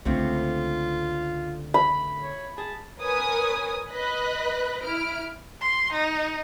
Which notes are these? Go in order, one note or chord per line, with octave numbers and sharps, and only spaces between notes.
C#2 D3 A3 C4 F4
B5
C#5
G#4 A5
A#4 B4 C#5 G#5 D#6
B4 D#5 B5 F#6
E4 F6 D7
C6
D#4